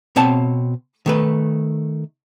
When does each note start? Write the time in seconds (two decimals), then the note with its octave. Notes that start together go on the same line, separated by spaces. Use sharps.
0.16 B2 C4 C#5 A5
1.06 D#3 A3 B4